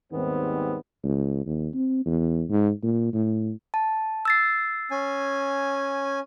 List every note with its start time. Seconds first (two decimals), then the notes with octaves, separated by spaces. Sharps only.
0.11 D#2 G#2 D#3 G3 B3 C4
1.04 C#2
1.46 D#2
1.74 C4
2.05 E2
2.49 G#2
2.83 A#2
3.13 A2
3.74 A5
4.25 E6 A6 C7
4.91 C#4 G#5